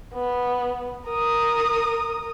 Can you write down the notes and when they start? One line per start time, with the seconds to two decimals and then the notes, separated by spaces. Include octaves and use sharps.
0.14 B3
1.07 A#4 D#6